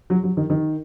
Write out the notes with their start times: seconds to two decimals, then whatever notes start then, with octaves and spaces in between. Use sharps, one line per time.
0.10 F#3
0.24 F#3
0.37 D#3
0.50 D#3